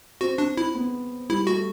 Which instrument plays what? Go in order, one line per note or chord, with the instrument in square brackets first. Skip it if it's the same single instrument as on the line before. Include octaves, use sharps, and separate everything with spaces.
[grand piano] C4 [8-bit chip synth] F#4
[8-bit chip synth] D4
E4
[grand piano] B3
[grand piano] G3 [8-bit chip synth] E4
[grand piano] A3 [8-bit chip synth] F#4